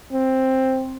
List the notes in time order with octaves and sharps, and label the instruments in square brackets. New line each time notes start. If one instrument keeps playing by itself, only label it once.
[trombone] C4